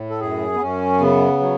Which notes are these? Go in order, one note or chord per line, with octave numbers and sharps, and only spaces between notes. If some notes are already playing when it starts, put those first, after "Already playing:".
Already playing: A2
A4
F#2 G#4
B3
F#2 C#4
C#3 B3
F#3